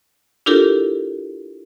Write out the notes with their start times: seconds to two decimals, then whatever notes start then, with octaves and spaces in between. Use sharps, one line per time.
0.46 D4 E4 F4 G4 A4 A#4